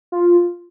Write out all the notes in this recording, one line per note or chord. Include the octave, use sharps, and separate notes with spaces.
F4